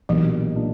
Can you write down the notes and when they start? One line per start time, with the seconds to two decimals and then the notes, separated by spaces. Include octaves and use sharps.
0.09 B1 A#2 E3 A#3 D4 G4
0.55 A#2 A#3 D4 G4